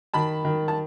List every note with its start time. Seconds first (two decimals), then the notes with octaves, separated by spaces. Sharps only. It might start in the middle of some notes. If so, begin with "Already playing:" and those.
0.14 D#3 A5 B5
0.45 D#3
0.68 A5